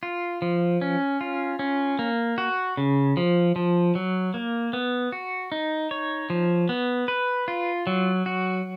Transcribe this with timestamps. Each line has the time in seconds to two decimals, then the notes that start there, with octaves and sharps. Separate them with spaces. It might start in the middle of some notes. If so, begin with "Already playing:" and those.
0.03 F4
0.42 F3
0.81 C#4
1.21 F4
1.59 C#4
1.99 A#3
2.38 F#4
2.77 C#3
3.17 F3
3.56 F3
3.95 F#3
4.34 A#3
4.73 B3
5.12 F#4
5.52 D#4
5.91 C#5
6.30 F3
6.69 B3
7.08 B4
7.48 F4
7.87 F#3
8.26 F#4